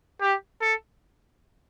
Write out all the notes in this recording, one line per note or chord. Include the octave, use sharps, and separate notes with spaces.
G4
A4